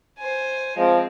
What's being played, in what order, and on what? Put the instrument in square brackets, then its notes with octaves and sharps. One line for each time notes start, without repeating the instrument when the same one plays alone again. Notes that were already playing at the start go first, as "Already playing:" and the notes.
[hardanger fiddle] C5 G#5
[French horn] F3 [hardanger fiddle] G#3 C4